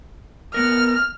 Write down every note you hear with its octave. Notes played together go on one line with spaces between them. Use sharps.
B3 A#4 F6